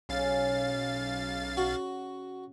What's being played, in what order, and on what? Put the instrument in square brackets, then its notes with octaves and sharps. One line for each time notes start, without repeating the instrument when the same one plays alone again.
[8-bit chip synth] B1 F5 A6 [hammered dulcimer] C#3
[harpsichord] F#4